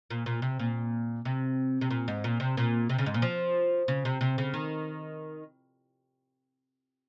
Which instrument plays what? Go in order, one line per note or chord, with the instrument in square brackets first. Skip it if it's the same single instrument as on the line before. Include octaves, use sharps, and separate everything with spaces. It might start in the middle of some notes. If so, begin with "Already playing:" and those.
[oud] A#2
A#2
C3
A#2
C3
C3
A#2
G#2
A#2
C3
A#2
C3
C#3
G#2
A#2
F3
C#3
C3
C3
C#3
D#3